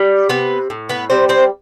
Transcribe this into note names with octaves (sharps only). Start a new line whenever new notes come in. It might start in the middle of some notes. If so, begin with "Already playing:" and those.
Already playing: G3
C3 B3 B4
A2
B3 B4
G3 C4 C5
C4 C5